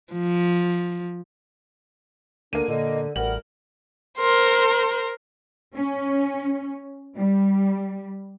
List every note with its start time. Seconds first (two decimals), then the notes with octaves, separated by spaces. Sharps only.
0.14 F3
2.53 D2 D3 A#3 D4 D#7
2.68 A#2 D3 D#5
3.16 A1 D2 G3 A#4 F#5 F#7
4.18 A#4 C5 C6
5.76 C#4
7.19 G3